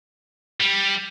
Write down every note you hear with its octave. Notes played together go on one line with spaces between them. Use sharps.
G3